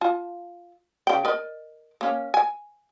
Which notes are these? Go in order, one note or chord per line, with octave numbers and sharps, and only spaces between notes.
F4 A5
C#3 G5
A#4 D5 D#5
A#3 C#4
G#5